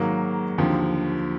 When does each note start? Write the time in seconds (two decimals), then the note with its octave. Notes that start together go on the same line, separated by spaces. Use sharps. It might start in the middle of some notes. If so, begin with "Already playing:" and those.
Already playing: G#2 D#3 F#3 A#3
0.58 D#2 D3 F3